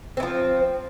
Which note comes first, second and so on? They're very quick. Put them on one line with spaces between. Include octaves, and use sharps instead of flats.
C4 E3 F3